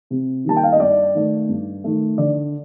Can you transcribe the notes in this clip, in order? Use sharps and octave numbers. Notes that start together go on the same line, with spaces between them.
C3
D#3 G3 A#3 A5
G5
F5
D#5
G2 D5
D#3 A3
G2
D#3 A3
D3 D5